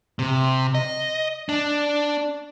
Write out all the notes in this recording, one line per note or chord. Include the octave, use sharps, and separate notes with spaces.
C3
D#5
D4